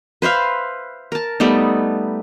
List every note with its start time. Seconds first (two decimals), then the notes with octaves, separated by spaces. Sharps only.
0.22 B4 C5 E5 F5
1.12 A#4 A5
1.40 G3 A3 B3 D#4